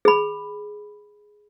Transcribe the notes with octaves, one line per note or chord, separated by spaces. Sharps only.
G#4 B5